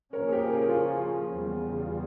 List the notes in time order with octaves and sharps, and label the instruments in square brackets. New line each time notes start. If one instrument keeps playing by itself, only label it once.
[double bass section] C#3 F3 A#3 C#4 [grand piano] A#4 C#5
[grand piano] G#4
G4 A#4
G#4
A#4
F4 G#4
[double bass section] E2 C#3 G3
[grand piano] F4